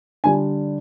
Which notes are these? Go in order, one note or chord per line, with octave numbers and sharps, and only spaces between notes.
D3 G3 G#5